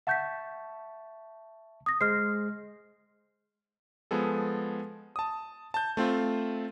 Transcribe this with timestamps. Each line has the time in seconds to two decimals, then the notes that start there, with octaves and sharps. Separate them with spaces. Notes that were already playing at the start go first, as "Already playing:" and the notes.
0.07 E5 F#5 A5 C#6 G6 B6
1.86 D#6 A#6
2.01 G#3 C5 F6 C7
4.11 F3 G#3 B3 G#4 A4
5.16 A5 D#6
5.74 A5 G6
5.97 A3 C4 F4 C5